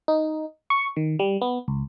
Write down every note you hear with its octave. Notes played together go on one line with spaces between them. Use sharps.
D#4
C#6
D#3
G3
B3
C#2